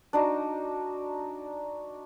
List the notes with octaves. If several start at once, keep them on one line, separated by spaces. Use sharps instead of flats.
D4 D#4 F#4